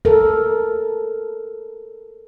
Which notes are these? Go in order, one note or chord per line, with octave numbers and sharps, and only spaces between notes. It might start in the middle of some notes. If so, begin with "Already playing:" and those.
A4 A#4